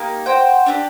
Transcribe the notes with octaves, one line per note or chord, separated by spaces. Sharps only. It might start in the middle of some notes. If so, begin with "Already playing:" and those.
Already playing: A#3 D#4 G4
F#4 C5 G5
D4 G4 D5